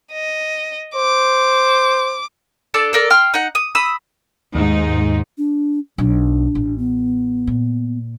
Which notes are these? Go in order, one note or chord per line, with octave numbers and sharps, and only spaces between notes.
D#5
C5 D6
D4 A4 A5 E6
A4 A#4 D5
G5 C6 F6
D#4 F#5
D#6
B5 D#6 E6
D#2 G#2 D#4
D4
B1 F#3 D4
A1
B3
A#2